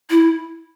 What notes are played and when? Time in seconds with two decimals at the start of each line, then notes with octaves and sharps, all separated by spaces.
0.10 E4